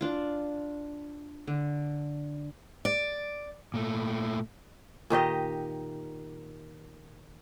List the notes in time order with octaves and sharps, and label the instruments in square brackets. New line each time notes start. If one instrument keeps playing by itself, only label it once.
[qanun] D4 F4
D3
[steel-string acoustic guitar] D5
[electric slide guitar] A#2 A3
[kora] A#2 D#3 G4 D#5